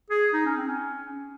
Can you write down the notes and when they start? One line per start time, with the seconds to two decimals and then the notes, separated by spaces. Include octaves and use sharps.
0.11 G#4
0.33 D#4
0.46 C#4
0.57 C4
0.68 C#4